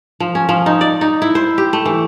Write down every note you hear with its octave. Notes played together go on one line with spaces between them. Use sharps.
F3
C#4
F3
D#4
D5
D#4
E4
C5
G4
A3
E3